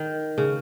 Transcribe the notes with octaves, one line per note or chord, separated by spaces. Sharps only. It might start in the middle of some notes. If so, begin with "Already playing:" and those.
Already playing: D#3
C#3